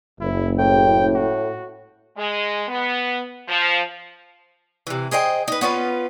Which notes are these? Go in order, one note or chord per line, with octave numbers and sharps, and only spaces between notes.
F#1 E4
A2 G5
F#4
G#3
B3
F3
C3 E3
G#4 C5 D#5 G5
D#4 B4
B3 C#4 F4 B4